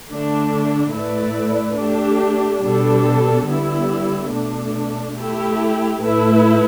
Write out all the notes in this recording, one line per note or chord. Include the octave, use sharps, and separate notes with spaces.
D3 A3 D4
A2 A3 E4 B4 D5
A3 D4 G4
B2 G3 D4 A4
D3 G3 B3 E4
B2 A3 D4
A3 E4 G4
A2 A3 E4 B4